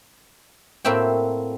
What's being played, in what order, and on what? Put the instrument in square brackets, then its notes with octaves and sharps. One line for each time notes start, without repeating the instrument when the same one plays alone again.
[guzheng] A2 A#3 C4 F#4 E5 G5